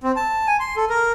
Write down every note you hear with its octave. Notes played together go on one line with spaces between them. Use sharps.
C4
A5
G#5
C6
A4
A#4